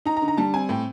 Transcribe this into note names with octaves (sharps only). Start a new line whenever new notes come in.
D#4 A#5
A#5
D3
A#5
G3 A5
C4 G#5
A2 G5